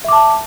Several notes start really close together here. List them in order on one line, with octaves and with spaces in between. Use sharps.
E5 D6 A5